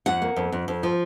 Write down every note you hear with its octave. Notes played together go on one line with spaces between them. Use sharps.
F2 F#5
A#3
F2
F2
F2
F3